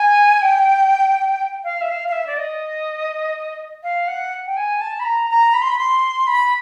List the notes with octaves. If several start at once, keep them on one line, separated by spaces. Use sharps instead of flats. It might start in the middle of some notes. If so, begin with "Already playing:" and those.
Already playing: G#5
G5
F5
E5
F5
F5
E5
D5
D#5
F5
F#5
G5
G#5
A5
B5
A#5
A#5
B5
C6
B5
C6
B5